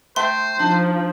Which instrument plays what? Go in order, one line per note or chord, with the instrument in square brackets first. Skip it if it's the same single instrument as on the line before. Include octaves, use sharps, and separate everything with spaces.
[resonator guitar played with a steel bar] A3 E5 G5 [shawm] C5 [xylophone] C6
[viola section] F3 [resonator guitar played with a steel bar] D4 D#4